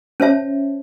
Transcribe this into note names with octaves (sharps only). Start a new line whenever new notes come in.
C#4 C5 C#5 E5 A5